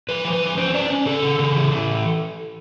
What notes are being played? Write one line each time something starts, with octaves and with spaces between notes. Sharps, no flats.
F3 B4
F3
B4
F3
C#4 C5
C#4 D5
C#4
C#3 A4
C#3
C#3
E3
E3